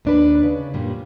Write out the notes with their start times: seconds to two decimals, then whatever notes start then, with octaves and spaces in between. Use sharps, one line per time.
0.05 D#2 D4 B4
0.43 C#3
0.73 F#2 A#2 G3